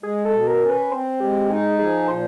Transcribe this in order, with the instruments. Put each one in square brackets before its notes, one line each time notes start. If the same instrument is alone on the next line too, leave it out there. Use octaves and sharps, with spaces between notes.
[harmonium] G#3 [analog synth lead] G#4
[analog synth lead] A4
[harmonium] B2
[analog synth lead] A#4
[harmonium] C#4
[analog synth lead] B4
[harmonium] C4 [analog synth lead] C5
[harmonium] G#3 [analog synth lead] G4
[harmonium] D#4 [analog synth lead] G#4
[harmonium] F3 [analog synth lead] G#4
[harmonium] A#2 [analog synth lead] C5